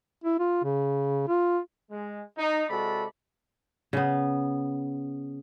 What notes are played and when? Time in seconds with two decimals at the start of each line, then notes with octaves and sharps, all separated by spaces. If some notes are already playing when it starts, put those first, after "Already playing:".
0.24 E4
0.39 F4
0.64 C#3
1.28 F4
1.91 G#3
2.38 D#4
2.69 C3 G#3 F#4 A4 D5 B5
3.93 C#3 B3